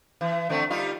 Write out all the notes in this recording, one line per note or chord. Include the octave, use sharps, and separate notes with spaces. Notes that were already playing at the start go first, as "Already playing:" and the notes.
E3
D3 A3 C4
G3 D#4 F4